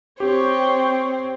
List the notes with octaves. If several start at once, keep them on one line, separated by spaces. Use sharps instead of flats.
C4 G4 C#5 G5